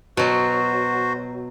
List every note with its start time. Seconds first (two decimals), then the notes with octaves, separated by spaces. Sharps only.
0.17 B2 F#3 F#4 C5